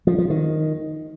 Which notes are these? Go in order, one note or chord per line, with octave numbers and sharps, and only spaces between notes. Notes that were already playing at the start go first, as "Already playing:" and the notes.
F3
F3
D#3